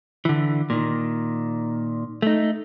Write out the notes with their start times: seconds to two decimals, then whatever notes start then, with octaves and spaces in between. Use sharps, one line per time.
0.25 D3 E3
0.70 A#2 D#3
2.22 A3 D#4